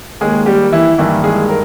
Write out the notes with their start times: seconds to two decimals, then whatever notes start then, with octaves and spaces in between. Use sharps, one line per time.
0.21 D#2 D#3 G#3 A#3 G#4
0.46 G3 G4
0.72 E3 E4
0.98 G2 D#3 E3 A#3 E4
1.23 G#3 G#4
1.49 A#4